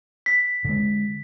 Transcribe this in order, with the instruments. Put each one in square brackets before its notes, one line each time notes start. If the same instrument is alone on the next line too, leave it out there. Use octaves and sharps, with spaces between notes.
[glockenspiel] B6
[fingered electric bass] D3 G#3